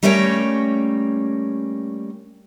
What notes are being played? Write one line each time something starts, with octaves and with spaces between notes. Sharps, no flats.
G3 A3 A#3 C#4 C#5 G5